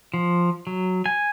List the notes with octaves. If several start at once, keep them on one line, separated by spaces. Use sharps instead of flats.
F3
F#3
G#5